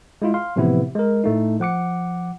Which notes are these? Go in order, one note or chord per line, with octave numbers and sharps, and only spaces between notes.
G#3 E4 F4
F5 C6
A2 C3 E3 F3 B3 E4
G#3 A#4
A2 A3 D#4
F3 F#5 D6 C#7